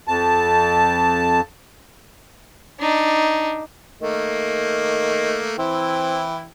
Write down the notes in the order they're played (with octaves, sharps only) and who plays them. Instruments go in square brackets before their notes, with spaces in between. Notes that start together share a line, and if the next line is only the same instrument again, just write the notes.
[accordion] F2 A5
[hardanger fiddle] D4 D#4
[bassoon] D#3 [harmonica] A3 A#3
[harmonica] E3 E4 G5 [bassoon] C4